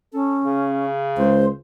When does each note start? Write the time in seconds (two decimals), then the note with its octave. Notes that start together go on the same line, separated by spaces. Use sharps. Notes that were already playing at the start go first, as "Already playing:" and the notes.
0.14 C#4 A4
0.44 C#3
1.17 C#2 C5